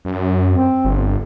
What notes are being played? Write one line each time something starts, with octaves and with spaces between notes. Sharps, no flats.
F#2
C4
G1